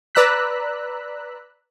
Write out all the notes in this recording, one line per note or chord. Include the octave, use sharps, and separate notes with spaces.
B4 D5 A#5 E6 F#6 B6